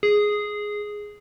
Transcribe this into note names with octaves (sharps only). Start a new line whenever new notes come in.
G#4